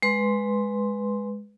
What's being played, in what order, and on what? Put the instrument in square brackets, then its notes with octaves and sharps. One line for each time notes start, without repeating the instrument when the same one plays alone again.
[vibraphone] G#3 B4 C6